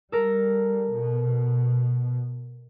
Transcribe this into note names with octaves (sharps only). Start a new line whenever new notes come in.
G3 A4 A#4
B2